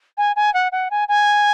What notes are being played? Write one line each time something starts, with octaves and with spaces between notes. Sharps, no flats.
G#5
G#5
F#5
F#5
G#5
G#5